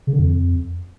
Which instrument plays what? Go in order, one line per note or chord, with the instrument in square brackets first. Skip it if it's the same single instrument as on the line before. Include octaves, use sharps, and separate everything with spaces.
[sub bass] C#3
D3
F2